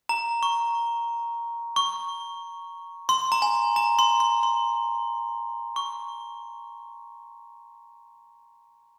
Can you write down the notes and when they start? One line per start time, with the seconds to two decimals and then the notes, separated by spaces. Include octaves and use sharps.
0.09 A#5
0.43 C#6
1.76 C#6
3.09 C6
3.32 A#5
3.42 G#5
3.76 A#5
3.99 C6
4.20 C6
4.43 C6
5.76 C#6